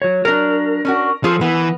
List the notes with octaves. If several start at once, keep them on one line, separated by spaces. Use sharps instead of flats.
F#3 C#5
F#3 D4 A#4
C#4 D4 F#4
F3 F4 G#4 A4
E3 B3